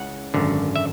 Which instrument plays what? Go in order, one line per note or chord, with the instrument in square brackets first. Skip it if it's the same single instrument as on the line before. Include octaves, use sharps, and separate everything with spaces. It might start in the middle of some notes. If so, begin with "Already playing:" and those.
Already playing: [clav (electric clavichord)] C#2 C#3 G#3 C#4 E4 F#5
G#1 F#2 D3
E5